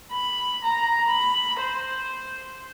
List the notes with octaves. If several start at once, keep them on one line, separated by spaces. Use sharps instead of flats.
B5
A#5
B5
C5